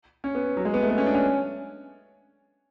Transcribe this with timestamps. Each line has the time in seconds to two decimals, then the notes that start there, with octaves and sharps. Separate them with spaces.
0.24 C#4
0.35 B3
0.57 F#3
0.65 G#3
0.74 B3
0.82 A3
0.90 B3
0.98 C#4
1.06 D4
1.14 C#4